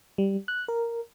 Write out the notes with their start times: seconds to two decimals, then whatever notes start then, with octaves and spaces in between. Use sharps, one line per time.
0.18 G3
0.48 F#6
0.68 A#4